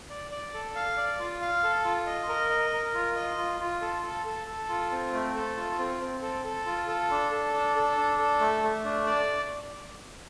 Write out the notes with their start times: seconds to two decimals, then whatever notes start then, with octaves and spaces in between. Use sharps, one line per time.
0.10 D5
0.31 D5
0.54 A4
0.76 F5
0.97 D5
1.19 F4
1.41 F5
1.64 A4
1.85 F4
2.06 D#5
2.29 A#4
2.50 D#5
2.73 A#4
2.95 F4
3.16 D#5
3.38 F4
3.60 F4
3.82 A4
4.03 A4
4.26 A4
4.47 A4
4.69 F4
4.91 C4
5.13 A3
5.35 A4
5.57 F4
5.79 C4
6.01 C4
6.22 A4
6.45 A4
6.66 F4
6.88 A4
7.10 D4
7.32 A4
7.53 D4
7.76 A4
7.97 D4
8.18 A4
8.40 A3
8.63 A3
8.85 D4
9.06 D5